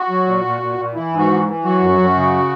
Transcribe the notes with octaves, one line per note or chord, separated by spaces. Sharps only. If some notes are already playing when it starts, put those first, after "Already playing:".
Already playing: F#4
F#3
A#2
A#2
A#2
A#2
E3 E4
G#2
F#4
E3
E3
F#3 F#4
F#2
F#2
C#3